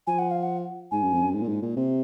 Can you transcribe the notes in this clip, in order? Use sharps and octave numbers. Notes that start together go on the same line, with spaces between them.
F3 G#5
F#5
F5
F#5
G#2 G#5
F#2
F2
F#2
G#2
A#2
G#2
A#2
C3